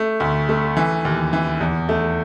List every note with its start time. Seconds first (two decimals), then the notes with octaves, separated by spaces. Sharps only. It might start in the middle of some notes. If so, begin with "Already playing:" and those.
Already playing: A3
0.20 D2
0.49 A3
0.77 E3
1.05 D#2
1.33 E3
1.61 E2
1.89 A3